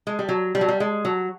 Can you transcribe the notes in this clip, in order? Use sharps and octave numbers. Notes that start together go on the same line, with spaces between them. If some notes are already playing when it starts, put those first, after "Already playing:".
G#3
G3
F#3
G3
F#3
G3
G#3
F#3